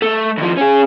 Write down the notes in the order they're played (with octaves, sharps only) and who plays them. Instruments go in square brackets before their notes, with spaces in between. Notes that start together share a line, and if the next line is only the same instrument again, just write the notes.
[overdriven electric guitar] A3
D#2 F3
C#4 G#4